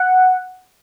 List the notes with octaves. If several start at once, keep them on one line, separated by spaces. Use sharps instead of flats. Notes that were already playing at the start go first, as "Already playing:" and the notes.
Already playing: F#5